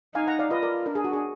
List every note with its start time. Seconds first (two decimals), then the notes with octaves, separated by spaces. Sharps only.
0.15 D#4 F5 G#5
0.28 F#5 A#5
0.39 D5 F5
0.51 F4 B4 D#5
0.62 A#4 D5
0.86 D4 A#4
0.95 G#4
1.04 F#4
1.13 G#4